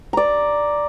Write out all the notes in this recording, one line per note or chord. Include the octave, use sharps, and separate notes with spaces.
D5 A#5